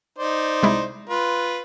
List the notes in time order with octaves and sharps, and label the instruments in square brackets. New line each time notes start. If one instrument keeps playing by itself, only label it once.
[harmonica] D#4 C5 D5
[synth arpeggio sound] C2 G#3 E4
[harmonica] F4 B4